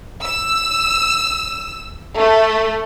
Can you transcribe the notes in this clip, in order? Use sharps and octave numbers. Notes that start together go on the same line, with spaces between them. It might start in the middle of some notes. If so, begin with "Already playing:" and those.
E6
A3